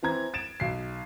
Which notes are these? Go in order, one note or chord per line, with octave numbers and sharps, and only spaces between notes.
E3 C4 A#5 G#6
A6 D7 E7
B1 C7